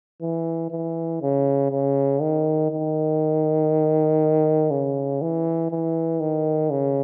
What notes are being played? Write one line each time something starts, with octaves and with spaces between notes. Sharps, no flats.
E3
E3
C#3
C#3
D#3
D#3
C#3
E3
E3
D#3
C#3